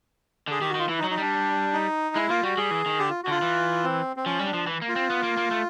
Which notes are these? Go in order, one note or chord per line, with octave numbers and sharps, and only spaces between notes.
D3 G#4
D#3 G4
F#4
D#3 F4
E3 E4
D#4
F#3
D#4
G3 D4
D#4
G#3 E4
A#3 F4
G3 F#4
G3 G#4
E3
D#3
D3 G4
F4
F#4
D3 F4
E3
C4
C4
F3 C#4
G3
D4
F3
E3
A#3
F4
C4
B3
A#3
A#3
A3